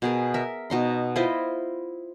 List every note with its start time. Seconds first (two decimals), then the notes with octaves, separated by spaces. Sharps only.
0.02 B2 G#4 A#4
0.34 A#4 E5
0.70 B2 D#4 C6
1.16 E4 F4 C5 D#5